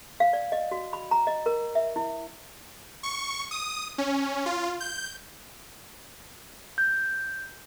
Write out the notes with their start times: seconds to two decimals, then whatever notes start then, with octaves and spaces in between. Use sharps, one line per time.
0.20 F5
0.33 D5
0.52 D#5
0.71 F#4
0.93 B5
1.11 A#5
1.27 D#5
1.46 A#4
1.75 E5
1.96 E4
3.03 C#6
3.51 D#6
3.98 C#4
4.46 F4
4.80 G6
6.78 G6